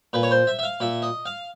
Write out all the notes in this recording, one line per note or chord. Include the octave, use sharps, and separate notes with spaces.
A#2 B4
C#5
C5
E5
E5
F5
A#2 E5
D#5
F5